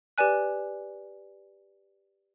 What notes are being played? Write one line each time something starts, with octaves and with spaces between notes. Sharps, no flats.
G4 B4 D5 G#5 F#6